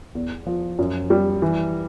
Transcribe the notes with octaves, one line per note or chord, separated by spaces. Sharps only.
E2
F3
F#2
G3
E3